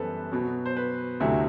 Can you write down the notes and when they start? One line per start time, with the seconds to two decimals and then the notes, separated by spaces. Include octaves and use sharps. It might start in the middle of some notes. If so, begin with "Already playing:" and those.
Already playing: F#2 E3 G3 B3 A4 B4 C5
0.32 B2 F#3 B3
0.66 C5
0.77 B4
1.20 D2 C3 F#3 A3 E4